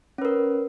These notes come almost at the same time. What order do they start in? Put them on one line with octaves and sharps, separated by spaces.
C#4 B4 A#4